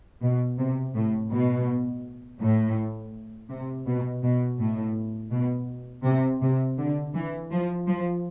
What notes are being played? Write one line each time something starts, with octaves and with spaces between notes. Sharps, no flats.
B2
C3
A2
B2
A2
C3
B2
B2
A2
B2
C3
C3
D3
E3
F3
F3